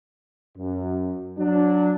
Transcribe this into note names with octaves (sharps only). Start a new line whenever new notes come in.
F#2
F#3 D4